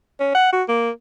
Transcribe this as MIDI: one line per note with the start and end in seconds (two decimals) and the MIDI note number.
0.20 0.34 61
0.35 0.50 78
0.53 0.63 66
0.68 0.90 58